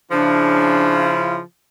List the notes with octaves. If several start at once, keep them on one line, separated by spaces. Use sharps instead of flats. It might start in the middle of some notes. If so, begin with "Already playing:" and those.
C#3 F3 D4 E4